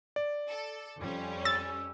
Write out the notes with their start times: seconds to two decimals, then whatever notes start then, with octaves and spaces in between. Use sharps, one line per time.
0.16 D5
0.49 A4
0.99 F2 G3 C#4
1.45 E6 A6